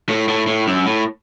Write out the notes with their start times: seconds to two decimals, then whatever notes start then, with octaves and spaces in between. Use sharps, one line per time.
0.09 A2
0.29 A2
0.47 A2
0.67 F#2
0.86 A2